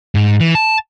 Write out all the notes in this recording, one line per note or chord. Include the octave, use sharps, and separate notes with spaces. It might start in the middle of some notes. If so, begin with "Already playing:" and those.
G#2
E3
A5